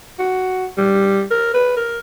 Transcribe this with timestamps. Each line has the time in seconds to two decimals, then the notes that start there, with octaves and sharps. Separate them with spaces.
0.19 F#4
0.78 G3
1.31 A#4
1.54 B4
1.77 A#4